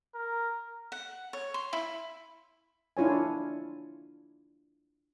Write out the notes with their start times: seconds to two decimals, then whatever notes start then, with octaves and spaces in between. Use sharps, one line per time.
0.14 A#4
0.92 F#5
1.33 C#5
1.54 C6
1.73 E4
2.97 D4 E4 F4 C#5 G#5